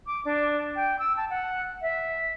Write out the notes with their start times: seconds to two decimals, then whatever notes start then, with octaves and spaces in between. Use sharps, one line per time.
0.07 D6
0.25 D4
0.76 G5
0.99 E6
1.17 A5
1.30 F#5
1.82 E5